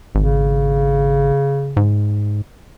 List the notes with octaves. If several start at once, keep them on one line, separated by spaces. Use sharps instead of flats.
G#1 C#3
G#2